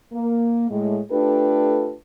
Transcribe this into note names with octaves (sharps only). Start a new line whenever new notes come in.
A#3
A2 G#3
A3 D4 F4 G4 A4 B4